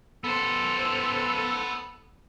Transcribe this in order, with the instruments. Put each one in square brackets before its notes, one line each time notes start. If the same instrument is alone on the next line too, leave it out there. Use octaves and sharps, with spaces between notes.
[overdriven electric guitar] B3 C5 [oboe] A4